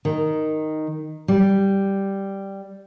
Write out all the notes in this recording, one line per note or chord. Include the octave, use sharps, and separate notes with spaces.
D#3
G3